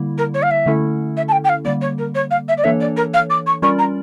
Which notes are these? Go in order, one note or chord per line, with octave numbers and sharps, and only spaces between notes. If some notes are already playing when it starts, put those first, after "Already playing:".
Already playing: D3 G3 A#3 E4
A#4
C#5
F5
E5
D3 A3 C#4 E4 A4
E5
A5
G5
G5
F5
D3 G3 A#3 D5
C#5
A#4
C#5
F5
E5
D5
E3 A#3 D4 A4 C#5 E5
D5
A#4
F5
D6
C#6
G3 C#4 F4 A#4 D5 C#6
A#5